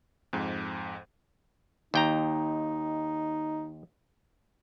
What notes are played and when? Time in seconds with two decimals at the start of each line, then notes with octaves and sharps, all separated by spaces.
0.33 F2 G#2
1.94 D#2 D#4 G5 A#5